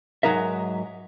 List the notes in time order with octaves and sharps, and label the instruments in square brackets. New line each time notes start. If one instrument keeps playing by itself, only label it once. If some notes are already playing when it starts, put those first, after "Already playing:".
[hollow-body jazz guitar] G#2 F#3 D#4 A#4 E5